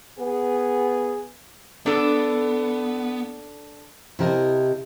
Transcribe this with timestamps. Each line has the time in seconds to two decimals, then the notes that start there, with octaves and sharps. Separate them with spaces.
0.19 B3 G#4
1.86 B3 D4 A4
4.19 C3 E4 G4 A#4 D#5 A5